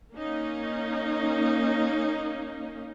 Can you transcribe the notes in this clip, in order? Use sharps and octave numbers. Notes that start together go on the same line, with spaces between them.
A#3 C#4 D#4